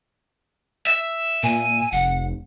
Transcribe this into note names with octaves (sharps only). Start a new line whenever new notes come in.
E5
A#2 G#5
F1 F#5